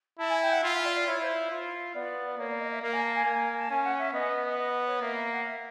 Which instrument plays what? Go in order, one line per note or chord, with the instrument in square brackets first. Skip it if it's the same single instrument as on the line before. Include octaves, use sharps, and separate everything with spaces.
[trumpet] E4 [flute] A5
[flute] G#5
G5
F#5
[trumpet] F4 [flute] E5
[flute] E5
D5
D5
[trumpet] E4 [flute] C#5
[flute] C5
[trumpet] F4
[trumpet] B3 [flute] D5
[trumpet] A#3 [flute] C#5
[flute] D5
D#5
E5
[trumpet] A#3 [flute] F5
[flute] G#5
A5
G#5
[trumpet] A#3
[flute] A5
[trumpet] C#4 [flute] G#5
[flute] F#5
E5
[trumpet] B3 [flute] D#5
[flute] D#5
C#5
[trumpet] A#3 [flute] E5
[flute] E5
F#5
E5